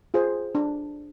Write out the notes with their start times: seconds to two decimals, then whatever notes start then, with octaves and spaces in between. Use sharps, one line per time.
0.14 F4 G#4 C5
0.55 D4